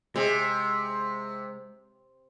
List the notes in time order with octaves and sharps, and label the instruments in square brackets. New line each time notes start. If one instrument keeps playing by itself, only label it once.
[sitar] C3 [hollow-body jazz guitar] G#3 G#4